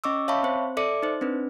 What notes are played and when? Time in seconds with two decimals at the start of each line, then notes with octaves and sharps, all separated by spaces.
0.04 C#4 D#5 C#6 D6 E6
0.28 C#5 E5 F5 A5 B5 C#6
0.43 C4 C5
0.77 A4 D5 E5 D6 C#7
1.03 D#4 C5
1.21 C4 D4 B4